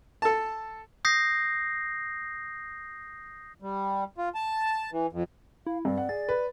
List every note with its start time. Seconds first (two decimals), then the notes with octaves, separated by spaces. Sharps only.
0.22 A4 A5
1.05 D#6 G6 A#6 C7
3.62 G3
4.18 F4
4.35 A5
4.92 E3
5.13 F2
5.66 E4 F5
5.85 G2 C4 D5
5.98 F#5
6.09 G#4 A6
6.29 B4